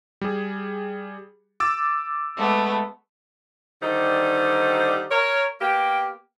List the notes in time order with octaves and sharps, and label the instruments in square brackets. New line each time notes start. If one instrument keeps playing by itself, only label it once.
[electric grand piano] G3 G#4
D6 E6 A6
[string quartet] G#3 A3 B3
[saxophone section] D3 D#3 G3 D#4 C5
A#4 C#5
A#3 B3 G4